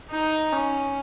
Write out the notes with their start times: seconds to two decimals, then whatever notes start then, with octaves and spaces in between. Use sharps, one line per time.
0.10 D#4
0.53 C#4